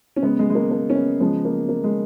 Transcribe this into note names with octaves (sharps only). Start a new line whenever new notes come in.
C#4
C#3 G#3 B3
G#3
G#3
A#3
A#3
C#4
B3
C#3 F3 G#3 B3
A#3
A#3
G#3